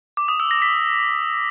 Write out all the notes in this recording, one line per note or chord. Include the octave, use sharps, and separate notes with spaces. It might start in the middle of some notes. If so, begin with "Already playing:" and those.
D6
D#6
E6
A#6
B6